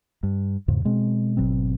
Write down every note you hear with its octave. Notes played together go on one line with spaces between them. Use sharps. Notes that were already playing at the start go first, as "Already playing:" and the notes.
G2
E2 G#2 C#3
B2 G#3 C4
G#1 B2 F#3 C4